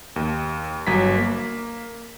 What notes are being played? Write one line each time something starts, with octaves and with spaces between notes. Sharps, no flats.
D#2
G1 F#3 A#5 B6
A#3